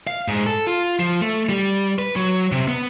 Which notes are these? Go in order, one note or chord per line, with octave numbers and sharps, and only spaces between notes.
F5
G#2
A4
F4
F3
A3
G3
B4
F#3
C3
B3